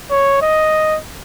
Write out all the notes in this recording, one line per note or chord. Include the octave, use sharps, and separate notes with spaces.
C#5
D#5